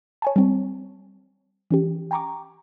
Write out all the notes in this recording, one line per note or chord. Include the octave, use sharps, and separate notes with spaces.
C#5 G#5 A5
G3 C4
E3 C#4 G4
G5 G#5 A#5 C#6 D6